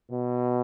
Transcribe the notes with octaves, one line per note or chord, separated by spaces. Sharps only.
B2